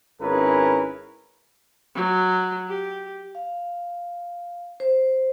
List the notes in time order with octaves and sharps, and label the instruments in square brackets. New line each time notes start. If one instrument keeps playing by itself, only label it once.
[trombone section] G#1 C#4 E4 G#4 A#4 B4
[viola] F#3
G4
[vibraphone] F5
C5